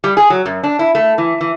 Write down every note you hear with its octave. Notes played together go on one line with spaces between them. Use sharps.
G3
G#4
F#3
F#2
D4
E4
A3
E3
E3